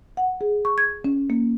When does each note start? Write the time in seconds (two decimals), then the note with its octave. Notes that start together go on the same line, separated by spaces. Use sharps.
0.17 F#5
0.41 G#4
0.65 C#6
0.78 G#6
1.04 C#4
1.30 A#3